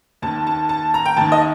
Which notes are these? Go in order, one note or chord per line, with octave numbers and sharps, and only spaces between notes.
D#2 D#3 A5
A5
A5
A#5
G5
D#2 D#3 A5
D#5